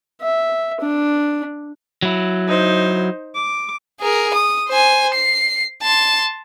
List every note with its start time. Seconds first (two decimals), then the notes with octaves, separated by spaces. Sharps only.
0.21 E5
0.81 D4
2.02 F#3 E4
2.48 D#4 C5
3.35 D6
4.00 G#4 A#4
4.34 D#6
4.68 C5 G#5
5.14 C7
5.82 A5 C6